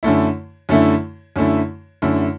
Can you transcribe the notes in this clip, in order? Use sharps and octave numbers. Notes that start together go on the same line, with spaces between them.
F#2 D3 A3 E4
F#2 D3 A3 E4
F#2 D3 A3 E4
F#2 D3 A3 E4